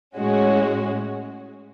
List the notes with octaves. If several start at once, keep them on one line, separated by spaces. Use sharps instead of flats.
A2 G#3 C#4 F#4